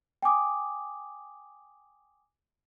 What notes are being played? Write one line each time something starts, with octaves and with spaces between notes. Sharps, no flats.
G5 G#5 D6 D#6